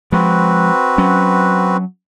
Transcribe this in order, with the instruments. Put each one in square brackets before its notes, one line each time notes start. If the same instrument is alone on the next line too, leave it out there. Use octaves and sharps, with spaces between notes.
[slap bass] F3 G#3 [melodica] C4 F#4 B4
[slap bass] F#3 C#4